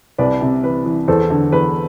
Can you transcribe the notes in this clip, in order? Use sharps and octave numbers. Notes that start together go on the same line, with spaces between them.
C2 B4 D5
C3
E3 B4
E3
E2 A4 C5
D3
E2 B4